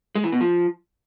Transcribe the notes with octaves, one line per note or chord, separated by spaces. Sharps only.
G#3
E3
B2
F3